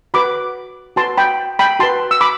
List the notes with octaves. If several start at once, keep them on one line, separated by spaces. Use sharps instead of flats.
F#4 B4 B5 D6
F#4 B4 A5 C6
G5 B5
G5 B5
F#4 B4 A5 C6
E6
B5 D6